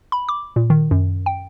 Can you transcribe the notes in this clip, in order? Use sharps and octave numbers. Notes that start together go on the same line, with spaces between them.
B5
D6
A#2
D#3
F#2
G5